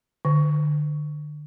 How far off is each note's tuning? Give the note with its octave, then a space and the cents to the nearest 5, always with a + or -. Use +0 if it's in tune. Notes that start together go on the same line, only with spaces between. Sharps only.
D3 +30